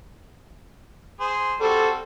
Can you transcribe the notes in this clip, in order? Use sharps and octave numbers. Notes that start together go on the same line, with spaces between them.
G#4 C5
G3 C4 F#4 A4